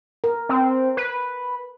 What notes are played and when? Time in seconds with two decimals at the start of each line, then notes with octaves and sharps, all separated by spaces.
0.24 A#4
0.49 C4
0.97 B4